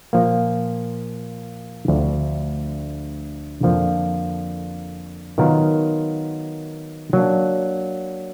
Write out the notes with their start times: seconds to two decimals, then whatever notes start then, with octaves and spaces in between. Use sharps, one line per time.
0.13 A#2 F3 A#3
1.88 D2 D3 F3
3.63 F2 D3 F3 A#3
5.38 D#3 F#3 B3 F4 A#4
7.13 F#3 A#3 D4